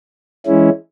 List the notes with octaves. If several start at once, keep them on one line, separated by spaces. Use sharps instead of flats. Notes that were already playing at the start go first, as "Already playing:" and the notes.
E3 G#3 C#4 E4